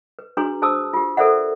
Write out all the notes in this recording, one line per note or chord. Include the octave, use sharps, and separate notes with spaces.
B4
D4 F#4 G#4 B4 A#5 C6
G#4 C5 A5 D#6 E6
F4 G4
A4 A#4 C5 D5 E5 F#5